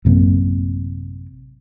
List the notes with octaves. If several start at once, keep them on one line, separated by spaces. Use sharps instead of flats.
A1 F#2 C3 A#3